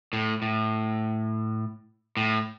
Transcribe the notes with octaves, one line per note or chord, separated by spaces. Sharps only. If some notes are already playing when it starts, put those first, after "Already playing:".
A2
A2
A2